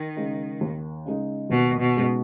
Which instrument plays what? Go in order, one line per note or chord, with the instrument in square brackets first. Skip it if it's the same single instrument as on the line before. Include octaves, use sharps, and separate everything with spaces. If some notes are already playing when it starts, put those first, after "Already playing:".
Already playing: [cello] D#3
[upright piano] C#3 G#3 D#4
D#2
C#3 G#3 D#4
[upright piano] D#2 [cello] B2
[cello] B2
[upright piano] C#3 G#3 D#4